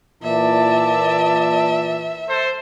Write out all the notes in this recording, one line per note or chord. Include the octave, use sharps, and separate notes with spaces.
A#2 E3 D5 E5 A5
A4 C5